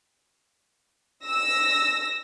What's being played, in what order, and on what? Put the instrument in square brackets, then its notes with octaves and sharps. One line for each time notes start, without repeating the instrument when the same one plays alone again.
[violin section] E6 A#6